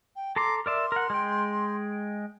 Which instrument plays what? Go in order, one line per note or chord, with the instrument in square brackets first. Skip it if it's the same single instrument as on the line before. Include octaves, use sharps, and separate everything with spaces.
[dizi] G5
[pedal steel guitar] A4 A#5 C6 [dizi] D6
[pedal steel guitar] A#4 D5 E5 [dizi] C6
[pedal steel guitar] A#4 F#5
G#3 G5